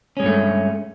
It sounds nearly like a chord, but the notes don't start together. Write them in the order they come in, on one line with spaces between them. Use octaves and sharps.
C#4 G#3 G2 A3